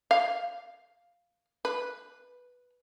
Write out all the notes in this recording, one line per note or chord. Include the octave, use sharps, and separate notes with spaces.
F5
B4